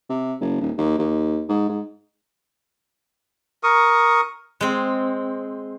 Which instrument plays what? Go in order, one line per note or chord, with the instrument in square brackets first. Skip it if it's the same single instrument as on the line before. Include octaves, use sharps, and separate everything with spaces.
[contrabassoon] C3
F#1
D#1
D#2
D#2
G#2
G#2
[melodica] A#4 C#6 D#6
[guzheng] G#3 C4